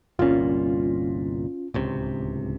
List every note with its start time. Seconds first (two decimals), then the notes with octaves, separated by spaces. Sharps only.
0.19 G1 C2 A#2 C#4 F4
1.74 D1 C#2 C3